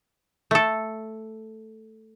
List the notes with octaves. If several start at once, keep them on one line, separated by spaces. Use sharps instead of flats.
A3 A4